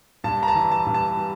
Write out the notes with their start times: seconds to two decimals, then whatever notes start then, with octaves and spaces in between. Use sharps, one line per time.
0.24 G2 A5
0.43 A#5
0.48 A5
0.55 E3
0.72 A5
0.86 G2
0.94 A5
1.17 G3